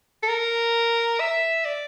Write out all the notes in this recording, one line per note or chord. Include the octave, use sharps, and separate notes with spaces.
A4
A#4
E5
D5